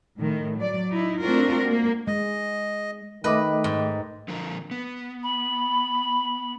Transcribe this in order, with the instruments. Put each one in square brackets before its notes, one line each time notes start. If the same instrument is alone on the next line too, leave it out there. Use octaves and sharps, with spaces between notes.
[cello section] A2 D#3
F#3 D5
D#4 E4
A3 C4 D4 F4 F#4 A#4
A#3
[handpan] G#3 [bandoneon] D#5
[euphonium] D#3 [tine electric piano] A3 D#5 D6 [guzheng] B4
[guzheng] G#2
[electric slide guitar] D3 F3 A#4
B3
[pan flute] B5